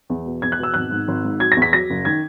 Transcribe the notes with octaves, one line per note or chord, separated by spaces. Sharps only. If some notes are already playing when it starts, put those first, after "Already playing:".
E2
B2
E2 G#6
F#6
B2 E6
G#1 F#6
G#2
G#1
G#2
F#3 G#6
A#6
E2
B6
F#3 A#6
F#1
D#3 G#6